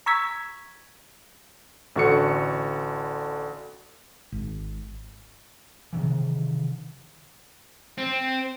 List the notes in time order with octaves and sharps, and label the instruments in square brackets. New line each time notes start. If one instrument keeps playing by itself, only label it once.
[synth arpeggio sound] A#5 C#6 E6 G#6 B6
[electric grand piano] A1 D3 F#4 A4 C#7
[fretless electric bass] G#1
[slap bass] C3 D#3 E3
[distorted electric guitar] C4